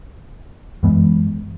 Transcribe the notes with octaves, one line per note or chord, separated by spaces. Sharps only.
F#2 E3 G#3 B3